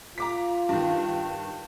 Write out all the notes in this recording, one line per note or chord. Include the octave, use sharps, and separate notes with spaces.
F4 A#5 D6 B6
G2 D#3